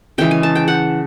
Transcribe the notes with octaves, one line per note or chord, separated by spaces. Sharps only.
C#3 E3 G#3 G5
G#5
A5
G5
F#5